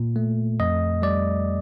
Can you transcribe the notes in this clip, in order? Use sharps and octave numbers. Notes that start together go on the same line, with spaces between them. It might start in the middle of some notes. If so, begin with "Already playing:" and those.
Already playing: A#2
A3
F2 D#5
G3 D5